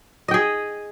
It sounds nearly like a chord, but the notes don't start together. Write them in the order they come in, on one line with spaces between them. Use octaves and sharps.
D#5 G5 G#4